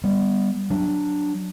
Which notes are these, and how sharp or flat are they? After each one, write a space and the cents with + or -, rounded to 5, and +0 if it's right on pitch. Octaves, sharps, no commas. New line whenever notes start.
G3 +10 B3 -5
F#3 +0 D4 +0